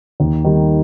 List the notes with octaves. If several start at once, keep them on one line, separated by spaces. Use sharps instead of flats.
D#2
D#3 G3